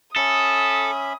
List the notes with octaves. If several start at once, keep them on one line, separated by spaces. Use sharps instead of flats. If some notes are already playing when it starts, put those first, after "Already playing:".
C#4 A4 E5 B5 D#6